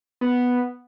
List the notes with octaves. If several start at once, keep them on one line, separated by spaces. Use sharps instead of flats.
B3